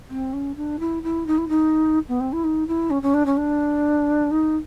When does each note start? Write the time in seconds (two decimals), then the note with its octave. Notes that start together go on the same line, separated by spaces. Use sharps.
0.09 C4
0.33 C#4
0.56 D4
0.79 E4
1.03 E4
1.27 D#4
1.38 E4
1.48 D#4
2.08 B3
2.20 C4
2.32 E4
2.44 D#4
2.67 E4
2.90 C#4
3.02 C#4
3.14 D4
3.26 C#4
3.37 D4
4.31 D#4